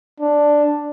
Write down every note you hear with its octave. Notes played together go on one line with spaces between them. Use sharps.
D4